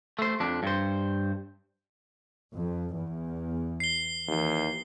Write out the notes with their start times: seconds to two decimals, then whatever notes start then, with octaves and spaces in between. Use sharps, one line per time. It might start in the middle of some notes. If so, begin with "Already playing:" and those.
0.19 A3 C5
0.40 F2 D4
0.63 G2 C5
2.54 F2
2.94 E2
3.80 C7 G7
4.28 D#2 E3